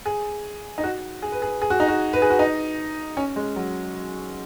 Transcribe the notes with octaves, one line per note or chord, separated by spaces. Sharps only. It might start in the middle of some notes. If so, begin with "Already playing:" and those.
G#4
D#4
F#4
G#4
B4
G#4
G#4
F#4
D#4
F#4
B4
G#4
F#4
D#4
C#4
G#3
F#3